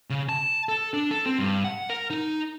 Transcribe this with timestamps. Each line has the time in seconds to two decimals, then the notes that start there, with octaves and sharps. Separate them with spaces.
0.10 C#3
0.29 A5
0.69 A4
0.94 D4
1.11 A4
1.26 C4
1.39 G2
1.64 F#5
1.90 A#4
2.10 D#4